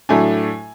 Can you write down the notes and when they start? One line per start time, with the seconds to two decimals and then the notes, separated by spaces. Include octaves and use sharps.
0.09 A2 F#3 A3 D4 G#5